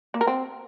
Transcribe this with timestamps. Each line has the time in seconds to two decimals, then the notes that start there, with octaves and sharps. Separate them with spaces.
0.14 A#3
0.21 A#4
0.27 C4